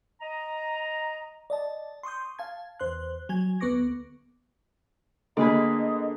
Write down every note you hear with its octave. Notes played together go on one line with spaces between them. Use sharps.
D#5 A#5
D5 D#5 A5
C6 C#6 D#6 G6
F5 A5 G#6
E2 C5 C6 F#6
F#3 G#5 G#6
D2 B3 B4 C#6 D6 A#6
D3 A#3 G#4 B4 D#5